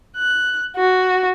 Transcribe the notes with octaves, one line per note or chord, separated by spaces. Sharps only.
F#6
F#4